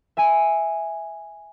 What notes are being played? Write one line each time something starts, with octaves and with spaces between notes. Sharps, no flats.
E5 G#5